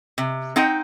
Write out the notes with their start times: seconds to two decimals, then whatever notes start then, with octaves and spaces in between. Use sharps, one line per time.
0.18 C3
0.56 C4 D#4 F#5 G5